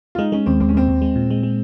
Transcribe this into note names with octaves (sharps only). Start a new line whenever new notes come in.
F4
G#3 D#4
G#3 C#4
D#2 C4
D#2 C4
C#4
D#2 C4
D#2
G#3
A#2
G#3
G#3